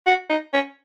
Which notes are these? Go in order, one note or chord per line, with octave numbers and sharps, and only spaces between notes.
F#4
D#4
C#4